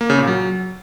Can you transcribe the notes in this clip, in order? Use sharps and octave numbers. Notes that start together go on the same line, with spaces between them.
A#3
C#3
A#2
F#3